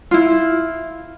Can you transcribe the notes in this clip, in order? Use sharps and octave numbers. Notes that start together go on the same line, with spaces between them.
E4 F4